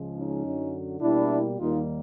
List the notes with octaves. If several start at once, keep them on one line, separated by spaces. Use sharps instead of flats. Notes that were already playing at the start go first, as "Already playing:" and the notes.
Already playing: C#2 C#3 F3 G#3
C#4 D#4
F#2 D3 F#3
B2 G3 A#3 D4 E4
D#2 D#3 G3 A#3 D#4 F4